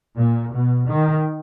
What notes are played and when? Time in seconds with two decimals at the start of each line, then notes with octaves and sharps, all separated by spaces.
0.18 A#2
0.53 B2
0.90 D#3